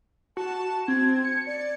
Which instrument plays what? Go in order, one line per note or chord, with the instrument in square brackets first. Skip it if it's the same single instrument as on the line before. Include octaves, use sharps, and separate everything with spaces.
[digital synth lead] F#4 [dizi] A5
[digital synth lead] C4 [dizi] G#6
[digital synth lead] C#7
[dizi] D5